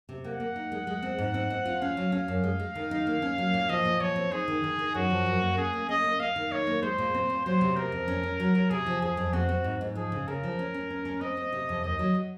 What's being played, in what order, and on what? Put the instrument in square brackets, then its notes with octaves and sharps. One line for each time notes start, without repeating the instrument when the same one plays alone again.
[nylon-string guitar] C3
[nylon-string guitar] A#3 [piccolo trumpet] F#5
[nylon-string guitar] A#3
D#4
G#3
G#3
C4
G#2
C4
C4
F4
[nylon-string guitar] C#4 [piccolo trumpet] F5
[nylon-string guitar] F#3
[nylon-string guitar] C#4 [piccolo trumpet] F5
[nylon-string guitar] F#2
G#3
G#3
D#3
D#4
A#3
C#4
F#3
A#2
[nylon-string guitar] F3 [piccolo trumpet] D#5
[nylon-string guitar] A#2
[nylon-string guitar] F3 [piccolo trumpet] C#5
[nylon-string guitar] C4
[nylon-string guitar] D#4 [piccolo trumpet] G#4
[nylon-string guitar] D#3
D#3
D#3
[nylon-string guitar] F#2 [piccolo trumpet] F#4
[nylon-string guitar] F3
F#2
A#3
[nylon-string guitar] C#4 [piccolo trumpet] G#4
[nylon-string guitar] A#3
[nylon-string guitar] C#4 [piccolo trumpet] D#5
[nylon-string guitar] A#3
[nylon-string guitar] A#3 [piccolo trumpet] F5
[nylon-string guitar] D#3
[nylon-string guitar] D#4 [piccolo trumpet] C#5
[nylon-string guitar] A#3
[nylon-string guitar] G#3 [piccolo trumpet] C5
[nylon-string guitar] A#2
C4
A#2
[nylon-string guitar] F#3 [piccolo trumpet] C5
[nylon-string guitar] C3
[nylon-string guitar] C4 [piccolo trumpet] A#4
[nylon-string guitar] F2
C#4
C#4
F#3
F#3
[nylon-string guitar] C3 [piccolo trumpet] G#4
[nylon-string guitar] F3
[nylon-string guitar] F2 [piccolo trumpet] G#4
[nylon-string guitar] F2
[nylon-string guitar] C4 [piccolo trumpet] F#4
[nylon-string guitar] C4
G#2
G#2
[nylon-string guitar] F3 [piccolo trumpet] G#4
[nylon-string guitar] C#3
[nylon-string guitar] C#3 [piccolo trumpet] A#4
[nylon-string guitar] F3
C#4
C#4
C#4
C#4
[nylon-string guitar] C4 [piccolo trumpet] D#5
[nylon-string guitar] C4
C3
F2
[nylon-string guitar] D#2 [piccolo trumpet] D#5
[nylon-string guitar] F#3
F#3